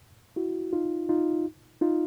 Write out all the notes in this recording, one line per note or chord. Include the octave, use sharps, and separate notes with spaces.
E4 F#4
D#4 F4
D#4 F4
D#4 F4